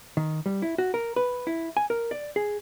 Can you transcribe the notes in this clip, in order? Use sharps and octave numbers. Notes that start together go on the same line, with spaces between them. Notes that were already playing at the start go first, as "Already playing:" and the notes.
D#3
G3
E4
F#4
A#4
B4
E4
G#5
A#4
D5
G#4